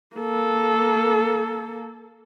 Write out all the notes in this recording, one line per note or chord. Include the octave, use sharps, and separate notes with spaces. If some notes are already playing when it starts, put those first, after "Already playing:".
A#3 A4